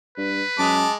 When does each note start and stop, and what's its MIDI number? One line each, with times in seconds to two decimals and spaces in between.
0.17 0.42 43
0.17 0.77 71
0.58 0.86 42
0.58 0.96 56
0.58 0.94 81
0.58 0.96 86